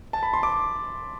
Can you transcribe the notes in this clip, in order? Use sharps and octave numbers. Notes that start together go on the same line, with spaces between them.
A5
B5
C6
D6